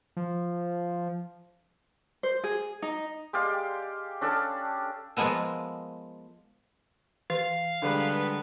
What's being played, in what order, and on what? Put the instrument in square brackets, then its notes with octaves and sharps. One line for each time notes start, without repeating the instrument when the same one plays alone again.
[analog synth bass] F3
[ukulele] C5
G#4
D#4
[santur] G#3 G4 D5 F5
C#4 D4 A4 A5
[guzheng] F3 G#3 A#3 B3 A4
[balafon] E3 [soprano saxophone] F5
[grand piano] D3 G3 G#3 [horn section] D#3 B3 B4